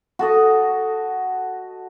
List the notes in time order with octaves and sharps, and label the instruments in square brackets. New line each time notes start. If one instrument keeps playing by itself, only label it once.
[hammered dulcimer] F#4 A4 D#5